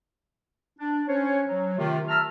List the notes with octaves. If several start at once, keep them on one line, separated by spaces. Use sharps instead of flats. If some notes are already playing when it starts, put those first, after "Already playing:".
D4
C#4 C5 C#5
F#3
C3 D#3 A3 F4
E5 A5 A#5 E6 F6